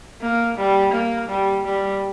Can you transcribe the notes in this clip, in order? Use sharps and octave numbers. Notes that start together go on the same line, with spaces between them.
A#3
G3
A#3
G3
G3